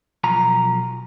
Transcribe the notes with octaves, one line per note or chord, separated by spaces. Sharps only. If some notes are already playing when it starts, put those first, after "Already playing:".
B1 F3 A#5